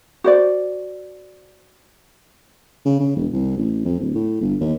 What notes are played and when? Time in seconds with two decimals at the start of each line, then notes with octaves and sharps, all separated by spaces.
0.24 F#4 C5 D5
2.85 C#3
3.00 C#3
3.16 E1
3.33 C2
3.57 A1
3.85 F2
4.00 D1
4.15 A2
4.41 G1
4.61 D#2